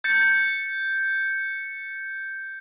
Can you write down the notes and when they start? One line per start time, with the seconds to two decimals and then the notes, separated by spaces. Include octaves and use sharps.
0.04 G6 A6 C#7